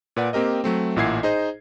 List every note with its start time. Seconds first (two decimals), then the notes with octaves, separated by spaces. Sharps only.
0.16 A#2 B4 D5 F#5
0.33 A#3 C4 G4 A#4 D#5
0.64 F#3 A3 C4
0.96 A1 A#2 E4 F#5 G#6 C7
1.23 D#4 G#4 C5 D#5